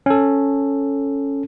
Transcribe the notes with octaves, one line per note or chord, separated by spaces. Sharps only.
C#4 A4